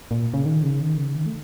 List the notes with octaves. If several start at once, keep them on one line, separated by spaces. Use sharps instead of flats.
A#2
C#3
D#3
C#3
D#3
C#3
D#3
A3